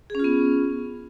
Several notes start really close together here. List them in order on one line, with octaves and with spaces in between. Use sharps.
G#4 C#4 F4 B3